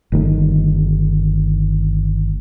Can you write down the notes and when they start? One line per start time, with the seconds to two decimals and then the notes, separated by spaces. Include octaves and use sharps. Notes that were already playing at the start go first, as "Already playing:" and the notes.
0.12 G1 D#3 A3